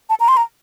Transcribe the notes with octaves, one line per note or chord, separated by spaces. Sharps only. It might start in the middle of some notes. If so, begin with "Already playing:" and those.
A5
A#5
C6
A#5